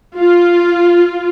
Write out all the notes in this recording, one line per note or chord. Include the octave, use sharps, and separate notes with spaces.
F4